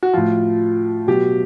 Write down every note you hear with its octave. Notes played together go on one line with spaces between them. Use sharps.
F#4
A2 F3 F4
B2 F#3 G4